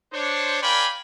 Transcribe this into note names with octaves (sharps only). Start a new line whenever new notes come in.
D4 C5 C#5
A#4 D5 F5 G5 G#5 B5